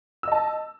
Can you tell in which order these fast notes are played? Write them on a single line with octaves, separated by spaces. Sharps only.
E6 D#5 A5